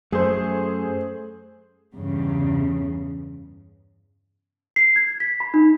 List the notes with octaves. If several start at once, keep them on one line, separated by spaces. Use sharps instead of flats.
F#2 A3 G#4 C5
E2 G2 C#3
C7
G#6
B6
B5
D#4